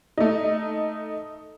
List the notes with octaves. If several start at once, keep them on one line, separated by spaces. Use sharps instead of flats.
A3 D#4